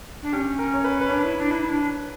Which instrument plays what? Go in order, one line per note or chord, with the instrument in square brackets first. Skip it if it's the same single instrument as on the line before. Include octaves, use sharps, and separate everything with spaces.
[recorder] D4
[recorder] C#4 [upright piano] G4
[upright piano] A#4
C#5
B4
B4
[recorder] D4 [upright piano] C#5
[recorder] E4
D4
E4
D4